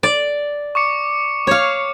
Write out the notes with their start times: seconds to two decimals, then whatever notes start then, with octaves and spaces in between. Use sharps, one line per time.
0.03 D5
0.75 C#6 D6 C#7
1.47 C#5 F5